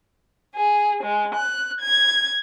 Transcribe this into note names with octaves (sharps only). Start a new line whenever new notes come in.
G#4
G#3
F#6
G#6